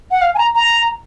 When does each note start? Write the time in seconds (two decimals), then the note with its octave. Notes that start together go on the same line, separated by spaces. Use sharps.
0.11 F#5
0.22 F5
0.34 G#5
0.38 A#5
0.55 A#5